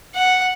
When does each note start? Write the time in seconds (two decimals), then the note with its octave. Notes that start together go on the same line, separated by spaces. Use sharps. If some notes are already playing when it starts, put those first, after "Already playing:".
0.15 F#5